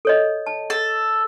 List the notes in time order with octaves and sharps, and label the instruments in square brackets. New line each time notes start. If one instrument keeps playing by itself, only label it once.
[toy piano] A4 C#5 D#5
A5
[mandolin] A4